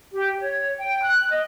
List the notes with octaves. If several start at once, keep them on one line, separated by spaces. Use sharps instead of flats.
G4
C#5
G5
F#6
D#5